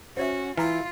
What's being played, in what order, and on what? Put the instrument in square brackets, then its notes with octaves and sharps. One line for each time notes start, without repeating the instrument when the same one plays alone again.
[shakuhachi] C#4 [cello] F#4 [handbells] C5 C#5 E5
[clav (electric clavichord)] E3 [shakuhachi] E4 [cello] F4 [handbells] A#5 F6